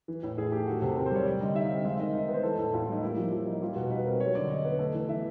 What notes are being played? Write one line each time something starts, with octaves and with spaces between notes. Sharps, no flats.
E3
A2
A2 G#4
A3 G4
D#3 F#4
C3 A4
C4 A#4
C5
G3 C#5
G3 D5
D3 D#5
D#4 E5
F5
C4
F5
G#3 E5
D#3 D#5
D#4
B3
C5
E3 A4
A2 A4
A2 F4
E4
G3 D#4
A#3 E4
F3
F3
D#4
G3 F4
B2 F#4
D#4 B4
C4 A#4
F#3 C#5
D3 D5
D3 D#5
B3
A3
E3
E3 E5